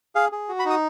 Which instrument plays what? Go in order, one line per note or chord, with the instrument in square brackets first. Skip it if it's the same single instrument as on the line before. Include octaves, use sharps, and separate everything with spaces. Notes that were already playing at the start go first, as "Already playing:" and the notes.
[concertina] G#4 F5
G#4
F#4
B5
D#4
D#6